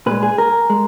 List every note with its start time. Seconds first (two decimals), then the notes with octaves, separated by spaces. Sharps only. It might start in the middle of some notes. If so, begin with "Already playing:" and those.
0.06 A#2 G#3 B4
0.23 G#4
0.38 A#4
0.70 G#3